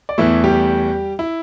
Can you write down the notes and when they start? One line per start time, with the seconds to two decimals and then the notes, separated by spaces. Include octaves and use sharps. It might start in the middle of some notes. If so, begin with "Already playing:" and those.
0.09 D5
0.18 E2 E3 A3 E4 E5
0.44 G3 G4
1.19 E4